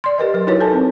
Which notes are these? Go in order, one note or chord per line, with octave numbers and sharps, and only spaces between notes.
D5 C6
G4 A#4 B4 D#5
F#3 A#4
D#4 E4 F#4 A#4 B4 C#5
A4 B4 G#5 A5
C4